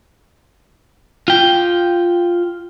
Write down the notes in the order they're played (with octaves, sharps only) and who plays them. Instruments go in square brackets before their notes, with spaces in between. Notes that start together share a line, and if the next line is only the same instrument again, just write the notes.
[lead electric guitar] F4 G5